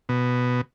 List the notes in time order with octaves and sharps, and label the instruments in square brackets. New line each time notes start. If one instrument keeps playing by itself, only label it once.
[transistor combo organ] B2